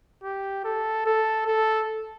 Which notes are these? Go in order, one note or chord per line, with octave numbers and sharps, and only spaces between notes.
G4
A4
A4
A4